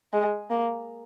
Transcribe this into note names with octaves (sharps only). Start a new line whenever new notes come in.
G#3
A#3